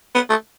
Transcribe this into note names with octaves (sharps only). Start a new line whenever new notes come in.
B3
A3